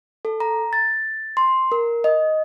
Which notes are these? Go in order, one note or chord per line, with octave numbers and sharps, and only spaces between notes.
A4
A#5
A6
C6
A#4
D#5